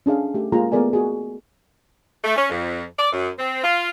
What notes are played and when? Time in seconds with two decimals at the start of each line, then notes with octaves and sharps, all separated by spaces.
0.06 C#4 D4 G#4 F5
0.34 A3 G4
0.52 G#3 A#3 F4 G#4 A#5
0.72 A3 B3 G#4 A#4 D5 G#5
0.93 F#4 G#4
2.24 A3
2.36 C#4
2.49 F2
2.99 D5
3.12 F#2
3.38 C4
3.63 F4